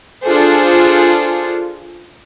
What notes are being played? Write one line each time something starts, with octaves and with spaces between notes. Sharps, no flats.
D4 F4 G#4 A4 C5